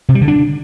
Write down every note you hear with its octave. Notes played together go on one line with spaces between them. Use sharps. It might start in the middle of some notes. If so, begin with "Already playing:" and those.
C3
G3
D3
D4